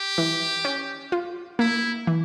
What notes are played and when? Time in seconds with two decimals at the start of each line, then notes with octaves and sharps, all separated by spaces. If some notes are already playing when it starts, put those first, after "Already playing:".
Already playing: G4
0.18 E3
0.65 C#4
1.12 F4
1.59 A#3 E4
2.07 E3